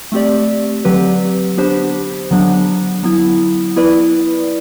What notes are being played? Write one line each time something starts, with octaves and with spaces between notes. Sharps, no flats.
A3 C4 G4 D5
D3 F#3 C4 G4 B4
B3 D4 G4 C5
D3 F#3 B3 D4
F#3 B3 E4
B3 E4 B4 D5